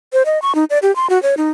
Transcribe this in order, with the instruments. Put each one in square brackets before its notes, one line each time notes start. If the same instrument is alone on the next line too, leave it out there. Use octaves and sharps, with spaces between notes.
[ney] C5
D#5
C#6
D#4
D5
G4
C6
F#4
C#5
D#4